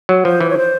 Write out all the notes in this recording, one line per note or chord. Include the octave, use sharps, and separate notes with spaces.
F#3
F3 C5
E3
C#5
C5